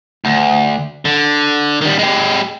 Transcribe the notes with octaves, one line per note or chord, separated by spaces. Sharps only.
D2
D3
D#3 G3
G#3 G4